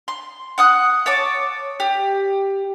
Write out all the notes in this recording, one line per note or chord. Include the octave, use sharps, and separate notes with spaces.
C6
F#5 D#6 F#6
C#5 A5 D6
G4